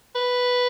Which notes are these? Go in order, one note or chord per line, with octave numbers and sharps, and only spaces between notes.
B4